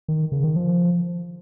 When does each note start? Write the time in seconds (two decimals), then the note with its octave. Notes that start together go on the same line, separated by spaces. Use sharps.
0.08 D#3
0.32 C#3
0.44 D#3
0.56 F3